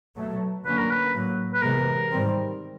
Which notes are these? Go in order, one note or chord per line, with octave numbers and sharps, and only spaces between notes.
B2 F#3 A3
D3 F#3 A#3 C#4 B4
A#4
B4
A2 F#3 A#3
B4
C3 E3 G#3 B3 A#4
G#2 D#3 G3 C4